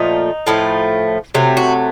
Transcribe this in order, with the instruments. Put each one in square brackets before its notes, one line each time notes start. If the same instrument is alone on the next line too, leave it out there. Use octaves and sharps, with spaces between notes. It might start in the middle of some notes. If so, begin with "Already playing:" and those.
Already playing: [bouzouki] A#2 F3 A3 D#4
A2 F3 A3
C3 F#3 A3
F#4